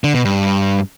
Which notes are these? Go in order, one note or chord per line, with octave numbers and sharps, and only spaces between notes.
D3
B2
G2